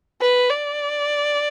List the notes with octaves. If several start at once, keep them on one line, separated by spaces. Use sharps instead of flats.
B4
D5